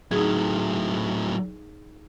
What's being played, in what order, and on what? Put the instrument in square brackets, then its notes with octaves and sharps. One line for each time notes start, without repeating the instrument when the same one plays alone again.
[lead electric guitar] A2 F#3 [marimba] D#4 G#4